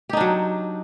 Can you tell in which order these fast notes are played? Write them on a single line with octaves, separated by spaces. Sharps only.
G4 D#4 D4 F#3